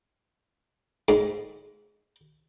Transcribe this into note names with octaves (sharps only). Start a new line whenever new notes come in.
G#2